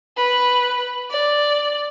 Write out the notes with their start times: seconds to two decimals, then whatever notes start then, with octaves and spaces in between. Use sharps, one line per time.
0.16 B4
1.10 D5